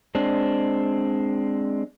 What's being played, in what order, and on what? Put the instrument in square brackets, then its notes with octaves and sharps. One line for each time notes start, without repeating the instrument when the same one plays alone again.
[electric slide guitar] G#3 C4 D4